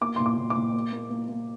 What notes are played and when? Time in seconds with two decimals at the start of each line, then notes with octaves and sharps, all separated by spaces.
0.01 A#3 D6
0.16 A#2 C6
0.26 D6
0.37 A#2
0.50 D6
0.57 A#2
0.74 A#3
0.92 A#3
1.10 A#3
1.29 A#3